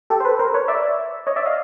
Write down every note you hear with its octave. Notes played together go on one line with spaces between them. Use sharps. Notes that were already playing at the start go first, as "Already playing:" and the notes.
G4 A4
C5
A4 B4
A#4 C5
B4 C#5
D5 E5
C#5 D#5
D5 E5
D#5 F5